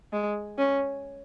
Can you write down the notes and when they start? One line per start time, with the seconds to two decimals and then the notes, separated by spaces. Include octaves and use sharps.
0.13 G#3
0.58 C#4